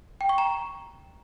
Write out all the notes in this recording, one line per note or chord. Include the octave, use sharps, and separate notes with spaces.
G5
C#6
A#5